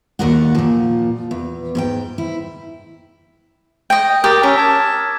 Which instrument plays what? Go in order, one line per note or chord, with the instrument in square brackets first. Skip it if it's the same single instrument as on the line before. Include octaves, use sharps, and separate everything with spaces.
[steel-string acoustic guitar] D#2 A#2 F#4 A#4 D5 F#5
A#2 F3
E2
G#2 B4 G5
E4
[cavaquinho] D#5 G5
[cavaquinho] G4 [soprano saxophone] A#4 [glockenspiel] D#6 F6 A6
[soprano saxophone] C#4 [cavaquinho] A#4 [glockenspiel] E6 B6
[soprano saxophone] A5 [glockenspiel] D6 G#6